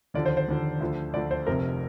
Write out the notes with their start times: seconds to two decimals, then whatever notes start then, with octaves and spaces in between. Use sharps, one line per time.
0.14 D#2 D3 F3 D5
0.26 C5
0.37 C5
0.48 D#2 D3 F3
0.80 D2 D3 F3
1.14 D2 D3 F3 D5
1.31 C5
1.47 F1 F2 C3 F3 A#4